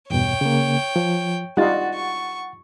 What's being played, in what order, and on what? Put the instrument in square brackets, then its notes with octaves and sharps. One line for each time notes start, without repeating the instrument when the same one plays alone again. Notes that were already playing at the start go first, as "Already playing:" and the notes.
[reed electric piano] E2 G2 B2 [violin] C#5 G5
[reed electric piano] C#3 A#3
F3
[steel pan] G3 D#4 F4 [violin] F#4 [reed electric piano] F#5 A6
[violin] C#6